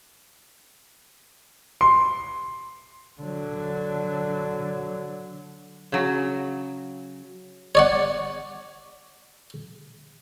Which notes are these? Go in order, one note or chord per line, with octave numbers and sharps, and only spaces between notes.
C6
D3 F#3
C#3 F#3
C#5 D5 F#5